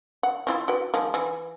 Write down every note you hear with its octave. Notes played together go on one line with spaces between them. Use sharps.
F#5
C4 E4 F4
F#4 B4 G5
D#3 F3 G#3
E3